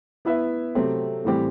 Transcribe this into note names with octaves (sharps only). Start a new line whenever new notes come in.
B3 E4 B4 E5
C3 F#3 A3 C4
A2 E3 G3 C4 G4